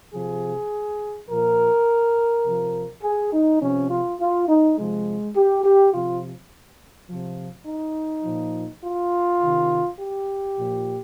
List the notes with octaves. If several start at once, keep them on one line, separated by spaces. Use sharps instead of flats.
C3 F3 G#4
A#2 F3 A#4
C3 F3
G#4
D#4
C3 F3 C#4
F4
F4
D#4
C3 F3 G#3
G4
G4
C3 F3 F4
C3 F3
D#4
A#2 F3
F4
C3 D#3
G4
A#2 F3